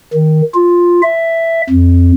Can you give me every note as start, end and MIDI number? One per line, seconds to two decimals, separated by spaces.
0.14 0.42 51
0.55 1.02 65
1.03 1.62 76
1.70 2.12 41